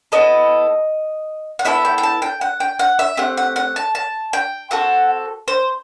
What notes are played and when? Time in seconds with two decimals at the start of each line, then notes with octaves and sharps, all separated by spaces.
0.12 B3 E4 A4 D#5
1.59 F#5
1.65 B3 E4 A4 E5
1.85 G5
1.98 G5
2.03 A5
2.22 G5
2.41 F#5
2.60 G5
2.79 F#5
2.99 E5
3.17 A3 C4 G4 F#5
3.37 F#5
3.56 F#5
3.76 A5
3.95 A5
4.33 G5
4.71 C4 F#4 A4 F#5
5.48 C5